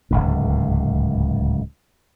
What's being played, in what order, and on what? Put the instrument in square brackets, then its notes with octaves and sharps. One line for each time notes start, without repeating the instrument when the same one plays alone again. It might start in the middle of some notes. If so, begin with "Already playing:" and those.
[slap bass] D1 G#1 C#2 G#2